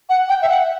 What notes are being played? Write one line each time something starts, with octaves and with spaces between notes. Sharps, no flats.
F#5
G5
E5
F#5